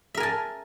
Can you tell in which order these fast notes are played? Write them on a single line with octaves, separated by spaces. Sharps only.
E5 A#4 G#5 A5